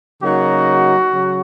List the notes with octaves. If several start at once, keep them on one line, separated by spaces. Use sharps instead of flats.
C#3 F#3 A#3 D#4 F#4
C#3 F#3